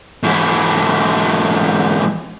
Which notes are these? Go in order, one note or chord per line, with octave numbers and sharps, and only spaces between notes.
G#2 E3